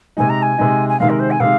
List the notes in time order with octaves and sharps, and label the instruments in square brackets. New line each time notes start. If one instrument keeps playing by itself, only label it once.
[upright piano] C3 G#3 D#4 [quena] G#5
[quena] A#5
G#5
[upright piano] C3 G#3 D#4
[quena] G#5
[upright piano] C3 D#3 G#3 [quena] F5
[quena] A#4
C5
G#5
[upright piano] C3 D#3 G#3 [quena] F5